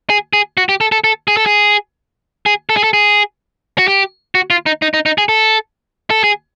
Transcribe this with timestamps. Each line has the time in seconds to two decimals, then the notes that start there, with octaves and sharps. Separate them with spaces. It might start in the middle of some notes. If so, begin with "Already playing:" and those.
0.10 G#4
0.33 G#4
0.57 F#4
0.69 G4
0.81 A4
0.92 A4
1.04 A4
1.28 G#4
1.37 A4
1.46 G#4
2.46 G#4
2.69 A4
2.77 G#4
2.84 A4
2.93 G#4
3.78 F#4
3.88 G4
4.35 F#4
4.50 F4
4.66 D#4
4.82 D#4
4.94 D#4
5.06 D#4
5.18 G#4
5.29 A4
6.10 A4
6.24 G#4